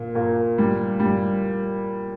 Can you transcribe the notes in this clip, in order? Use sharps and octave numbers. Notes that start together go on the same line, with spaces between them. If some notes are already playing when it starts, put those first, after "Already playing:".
Already playing: A#2
A#2
G3
G3